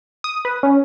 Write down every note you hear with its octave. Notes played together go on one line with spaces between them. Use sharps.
D#6
B4
C#4